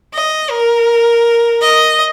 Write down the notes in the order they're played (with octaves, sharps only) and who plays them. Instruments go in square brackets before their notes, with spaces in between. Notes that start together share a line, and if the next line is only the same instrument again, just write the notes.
[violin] D#5
A#4
D#5